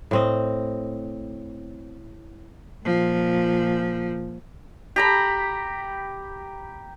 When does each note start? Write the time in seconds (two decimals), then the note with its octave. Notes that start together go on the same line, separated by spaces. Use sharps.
0.11 A2 C4 D#5
2.85 A#2 F3
4.96 G4 A#5 B5